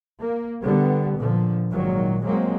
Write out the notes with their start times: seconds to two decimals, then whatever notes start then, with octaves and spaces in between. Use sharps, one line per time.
0.22 A#3
0.63 D3 G3 B3
1.18 A#2 D3 F3
1.70 G#1 A#2 D#3 F#3
2.24 F#3 G#3 A#3 C4